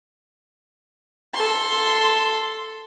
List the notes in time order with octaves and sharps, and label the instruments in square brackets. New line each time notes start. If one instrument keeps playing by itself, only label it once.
[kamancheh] A4 C6